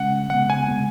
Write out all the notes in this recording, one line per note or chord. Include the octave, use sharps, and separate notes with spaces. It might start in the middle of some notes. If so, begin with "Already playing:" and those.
Already playing: C#3 G#3 C#4 F#5
C#3 G#3 B3 F#5
G#5
C#3 G#3 B3